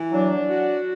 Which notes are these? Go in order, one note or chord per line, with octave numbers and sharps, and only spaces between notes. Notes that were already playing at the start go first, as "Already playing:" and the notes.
Already playing: E3
F#3 D4
F#4